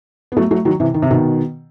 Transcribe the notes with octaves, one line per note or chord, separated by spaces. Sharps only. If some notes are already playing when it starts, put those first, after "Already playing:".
B3
F#3 A3
F#3 A3
D#3 F#3
C3 E3
D#3
C3
B2 D#3